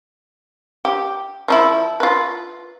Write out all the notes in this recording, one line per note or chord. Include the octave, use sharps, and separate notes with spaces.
G4
F3 D#4 E4
F4 B4